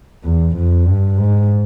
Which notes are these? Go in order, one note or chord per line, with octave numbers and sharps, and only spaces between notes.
E2
F2
G2
G#2